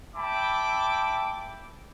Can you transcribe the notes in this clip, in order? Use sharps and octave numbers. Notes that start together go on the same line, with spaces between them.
E5 G5 A5 B5 D6